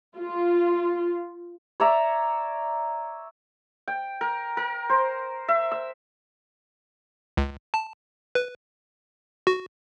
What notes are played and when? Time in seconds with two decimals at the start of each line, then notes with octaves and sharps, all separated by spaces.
0.17 F4
1.80 C#5 D5 E5 A#5
3.88 G5
4.21 A#4
4.57 A#4
4.90 C5
5.48 E5
5.72 E6
7.37 C#2
7.74 A5
8.35 B4
9.47 F#4